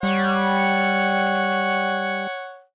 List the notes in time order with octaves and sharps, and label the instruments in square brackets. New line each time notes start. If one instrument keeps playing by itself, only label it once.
[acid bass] G3 [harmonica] C#5 F#5